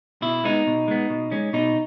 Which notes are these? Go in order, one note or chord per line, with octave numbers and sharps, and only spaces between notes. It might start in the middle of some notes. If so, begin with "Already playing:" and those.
B2 E4
G#3 B3 D#4
B2
G#3 B3
B2
G#3 C#4
B2 D#4